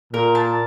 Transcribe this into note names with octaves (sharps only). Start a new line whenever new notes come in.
A#2 A#4
A5